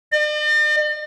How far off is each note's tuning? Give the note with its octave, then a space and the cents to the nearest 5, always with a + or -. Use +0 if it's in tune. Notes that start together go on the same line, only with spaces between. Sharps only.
D5 +45